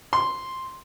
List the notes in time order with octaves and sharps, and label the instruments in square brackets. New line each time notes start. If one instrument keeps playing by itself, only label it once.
[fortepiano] C6